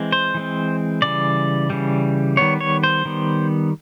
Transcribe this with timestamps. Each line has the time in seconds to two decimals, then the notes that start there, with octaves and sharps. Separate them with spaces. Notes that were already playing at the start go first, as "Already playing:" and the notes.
Already playing: E3 G#3 C4
0.12 C5
0.34 E3 G#3 C4
1.02 C#3 E3 G3 D5
1.70 C#3 E3 G3
2.37 D#3 G3 B3 C#5
2.61 C#5
2.83 C5
3.05 D#3 G3 B3